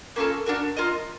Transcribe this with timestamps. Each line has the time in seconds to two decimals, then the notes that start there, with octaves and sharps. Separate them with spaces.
0.16 A#3 C#4 F4 A4
0.46 D4 F#4 A#4
0.77 F4 A#4 D#5